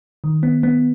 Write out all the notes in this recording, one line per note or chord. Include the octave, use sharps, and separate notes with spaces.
D#3
B3
B3